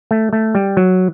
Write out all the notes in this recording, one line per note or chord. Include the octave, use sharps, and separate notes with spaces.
A3
A3
G3
F#3